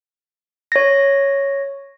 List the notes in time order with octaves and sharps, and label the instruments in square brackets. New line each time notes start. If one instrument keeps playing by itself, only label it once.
[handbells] C#5 A#6